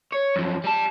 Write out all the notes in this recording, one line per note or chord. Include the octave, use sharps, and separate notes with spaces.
C#5
F#2 F3
G3 A5